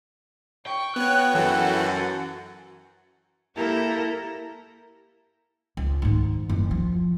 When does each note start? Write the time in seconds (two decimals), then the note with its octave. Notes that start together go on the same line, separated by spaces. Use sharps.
0.66 G5 C#6
0.96 B3 F#4 C#5 F#6
1.35 F#2 E3 F#4 A4
3.55 A#3 E4 G4 A4 A#4
5.77 C#2
6.02 G#2 D#3
6.49 F#1
6.71 F3